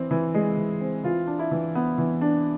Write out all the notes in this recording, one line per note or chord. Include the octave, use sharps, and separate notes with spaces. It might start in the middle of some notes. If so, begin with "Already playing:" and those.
Already playing: E3 C4
E3
G#3
E3
C4
E3 F4
D4
E4
E3
B3
E3
D4